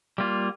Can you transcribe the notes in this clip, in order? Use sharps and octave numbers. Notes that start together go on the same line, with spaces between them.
G3 A#3 F4